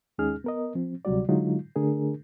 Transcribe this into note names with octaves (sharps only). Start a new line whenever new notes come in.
D#2 G#3 C#4 D#4 G#4 F6
B3 A#4 D#5
F3 C4
D2 C3 F#3 G3 F#4 D5
D3 F#3 G#3 D#4 F4
D3 A3 D4 G#4 A#4